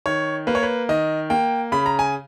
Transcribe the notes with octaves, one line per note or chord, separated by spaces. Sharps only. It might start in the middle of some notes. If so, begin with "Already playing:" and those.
D#3 C#5
A#3 B4
C#5
B4
D#3 D#5
A#3 G5
C#3 B5
A#5
G#5